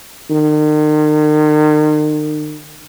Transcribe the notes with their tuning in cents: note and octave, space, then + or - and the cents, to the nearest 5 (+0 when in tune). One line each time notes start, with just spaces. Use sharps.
D#3 -40